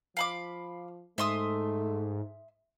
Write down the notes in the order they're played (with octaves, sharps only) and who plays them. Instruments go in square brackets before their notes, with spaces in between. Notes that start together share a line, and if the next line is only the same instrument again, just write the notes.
[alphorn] F3 [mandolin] F5 B5 D6
[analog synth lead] G#2 [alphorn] A3 [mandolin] E5 C6 D#6